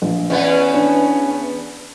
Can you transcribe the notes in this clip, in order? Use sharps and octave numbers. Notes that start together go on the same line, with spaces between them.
A#1
E2 B3 C#4 D#5 F#5
D4